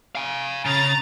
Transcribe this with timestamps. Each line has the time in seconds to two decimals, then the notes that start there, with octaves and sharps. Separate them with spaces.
0.15 F5 G#5
0.65 C#3 A#5 A6